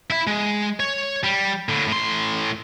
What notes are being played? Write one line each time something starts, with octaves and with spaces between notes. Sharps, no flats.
E4 E5
G#3
C#5
G3
A2 D3
A2 C6